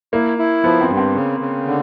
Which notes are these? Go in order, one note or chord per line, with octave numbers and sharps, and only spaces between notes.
A#3 E4
E4
F3 B3
C4
G2
C4
C#3
C#3
D3